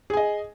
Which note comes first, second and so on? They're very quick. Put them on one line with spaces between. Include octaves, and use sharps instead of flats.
G#4 G#5 D#5